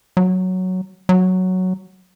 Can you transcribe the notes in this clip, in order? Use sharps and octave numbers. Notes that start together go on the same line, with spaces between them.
F#3
F#3